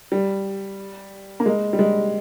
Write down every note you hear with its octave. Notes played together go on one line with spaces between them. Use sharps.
G3
A#3
G#3
G3
G#3